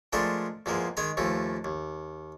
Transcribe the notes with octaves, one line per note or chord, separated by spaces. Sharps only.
F3 G#3 A3 D4 A#4 C5
E2 F3 G#3 A#3
D#3 G#3 G#5 A#5
D#2 E3 F3 A3
D#2